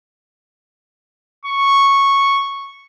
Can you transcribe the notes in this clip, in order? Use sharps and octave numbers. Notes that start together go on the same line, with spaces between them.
C#6